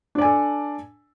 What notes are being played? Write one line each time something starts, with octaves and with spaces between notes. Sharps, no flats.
D4 A4 D5 G#5